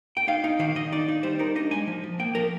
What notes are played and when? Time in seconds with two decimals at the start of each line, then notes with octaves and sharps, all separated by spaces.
0.17 G5
0.28 D#4 F5
0.44 D#4
0.59 D#3 F5
0.75 D#3 D#5
0.92 D#4 D5
1.08 D#4
1.23 G3 C5
1.39 D#4 A#4
1.55 D4 D#5
1.71 G#3 G#5
1.87 F3
2.04 F3
2.19 A#3 G5
2.35 F3 A#4